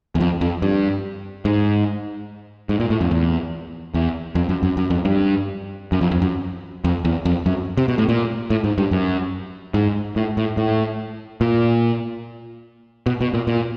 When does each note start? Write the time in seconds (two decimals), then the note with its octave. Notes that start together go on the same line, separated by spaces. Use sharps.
0.15 E2
0.20 F2
0.41 F2
0.62 G2
1.45 G#2
2.69 G#2
2.80 A#2
2.90 A2
3.01 F2
3.11 E2
3.94 E2
4.35 F2
4.49 F#2
4.63 F#2
4.77 F#2
4.90 F2
5.05 G2
5.92 F#2
6.01 F2
6.11 F2
6.22 F#2
6.84 F2
7.05 E2
7.25 F2
7.46 F#2
7.77 C3
7.88 B2
7.98 A2
8.09 A#2
8.50 A2
8.64 G#2
8.78 G2
8.91 F#2
9.74 G#2
10.16 A2
10.37 A2
10.57 A2
11.41 A#2
13.06 B2
13.21 B2
13.34 A#2
13.47 A#2